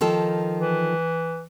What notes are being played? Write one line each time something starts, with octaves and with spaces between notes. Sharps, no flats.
D#3 F3 A4
E3